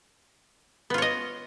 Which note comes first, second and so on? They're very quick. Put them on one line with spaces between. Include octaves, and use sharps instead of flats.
B3 F4 C#5 D#5